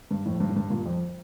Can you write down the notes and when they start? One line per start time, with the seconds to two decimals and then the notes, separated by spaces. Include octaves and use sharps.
0.11 G2
0.26 F2 A2
0.40 G2
0.49 A2
0.56 G2
0.70 G2 A#2
0.86 F2